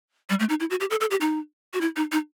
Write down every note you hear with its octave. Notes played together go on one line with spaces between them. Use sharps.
G3
A3
D#4
E4
F#4
G4
A4
A4
G4
D#4
F#4
E4
D#4
D#4